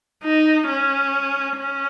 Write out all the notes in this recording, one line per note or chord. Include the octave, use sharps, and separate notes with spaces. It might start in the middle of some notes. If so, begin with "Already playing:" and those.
D#4
C#4
C#4